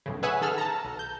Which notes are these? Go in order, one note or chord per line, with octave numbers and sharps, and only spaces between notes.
B1 A2 C#3
G#4 B4 C#5 E5 F#5 G#5
D#3 G#4 A4 F#5 E6 F6
A5 A#5
B1
G6